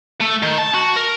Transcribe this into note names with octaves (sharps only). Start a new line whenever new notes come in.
A3
D#3
A5
F#4
A#4